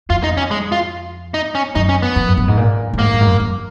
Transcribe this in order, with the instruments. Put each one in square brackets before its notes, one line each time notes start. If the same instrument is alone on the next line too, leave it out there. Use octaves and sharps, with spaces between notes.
[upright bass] F2 [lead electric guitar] F4
[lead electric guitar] D#4
C#4
G#3
F4
D#4
C#4
[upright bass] F#2 [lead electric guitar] D#4
[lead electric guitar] C#4
B3
[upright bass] F2
F#2
F#2
G#2
A#2
F#2
[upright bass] G#2 [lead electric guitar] A#3
[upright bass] F#2
G#2
F#2
F#2